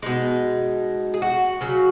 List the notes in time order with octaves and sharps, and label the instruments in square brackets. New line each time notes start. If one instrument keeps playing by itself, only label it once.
[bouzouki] B2 G#3 D#4
G#4
F#4
C#3 F#3